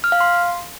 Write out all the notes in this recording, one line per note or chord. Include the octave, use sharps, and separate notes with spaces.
F6
F5
C6